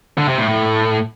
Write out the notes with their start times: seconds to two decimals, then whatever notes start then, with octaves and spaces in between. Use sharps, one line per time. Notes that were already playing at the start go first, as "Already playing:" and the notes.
0.18 D3
0.28 C3
0.38 A2
0.48 A2